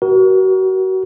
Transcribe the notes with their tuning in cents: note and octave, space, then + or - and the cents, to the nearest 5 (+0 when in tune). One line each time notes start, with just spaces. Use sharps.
F#4 +30 A#4 +35